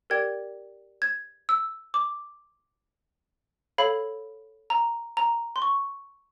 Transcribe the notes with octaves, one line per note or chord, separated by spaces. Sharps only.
G4 A#4 D5 G5 G#6
G#6
E6
D6
A4 C#5 F5 B5
A#5
A#5
C6
C#6